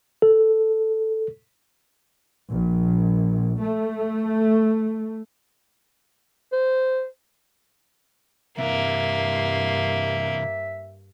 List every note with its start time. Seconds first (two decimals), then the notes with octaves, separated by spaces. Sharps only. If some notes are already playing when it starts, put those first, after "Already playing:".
0.22 A4
2.51 A#1
3.61 A3
6.52 C5
8.59 G2 C3 E3 A#3 E5